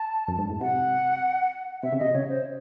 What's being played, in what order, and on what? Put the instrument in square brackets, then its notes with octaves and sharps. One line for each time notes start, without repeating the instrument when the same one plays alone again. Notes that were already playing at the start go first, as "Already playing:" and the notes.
Already playing: [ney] A5
[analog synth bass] F#2
G#2
A2
[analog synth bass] C3 [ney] F#5
[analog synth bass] C3 [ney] E5
[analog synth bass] C#3
[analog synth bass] C3 [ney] D#5
[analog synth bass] C#3 [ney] C#5
[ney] C5